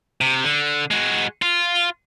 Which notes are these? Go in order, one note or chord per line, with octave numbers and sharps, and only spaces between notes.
C3
D3
G#3 F#4
F4